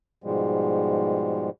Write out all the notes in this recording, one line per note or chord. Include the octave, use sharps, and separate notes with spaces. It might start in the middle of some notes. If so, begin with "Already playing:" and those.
G#2 B2 F3 G3 G#3